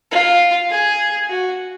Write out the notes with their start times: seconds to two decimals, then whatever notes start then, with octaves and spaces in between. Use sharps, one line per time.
0.11 F4
0.70 G#4
1.29 F#4